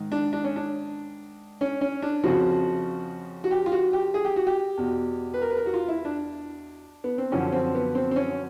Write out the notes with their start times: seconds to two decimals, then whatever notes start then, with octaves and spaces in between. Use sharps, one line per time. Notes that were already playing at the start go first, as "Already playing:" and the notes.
Already playing: G#2 D#3
0.12 D4
0.33 D4
0.44 C#4
0.56 D4
1.61 C#4
1.81 C#4
2.02 D4
2.24 F2 C#3 F3 F#4
3.44 F#4
3.51 G4
3.66 F4
3.72 F#4
3.93 G4
4.14 G#4
4.25 G4
4.36 F#4
4.47 G4
4.77 E2 B2
5.34 B4
5.42 A#4
5.50 B4
5.57 A#4
5.66 F#4
5.74 F4
5.88 E4
6.05 D4
7.04 B3
7.18 C4
7.32 F#2 D3 F3 C#4
7.52 C4
7.75 B3
7.95 C4
8.11 C4
8.16 C#4